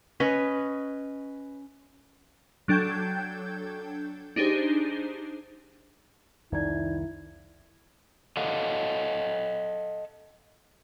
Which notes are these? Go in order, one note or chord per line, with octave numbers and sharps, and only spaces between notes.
C#4 B4 D#5
F#3 D4 A4 G5 G6 G#6
D4 D#4 G4 G#4 C5
C2 F2 D#3 D#4 E4 D5 G#6
A4 D#5 F5 F#5